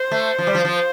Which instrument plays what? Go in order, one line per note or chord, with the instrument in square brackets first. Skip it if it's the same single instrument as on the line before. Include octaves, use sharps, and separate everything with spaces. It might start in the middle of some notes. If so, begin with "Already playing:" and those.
Already playing: [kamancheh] C5
[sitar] A3
F3
G3
F3
F3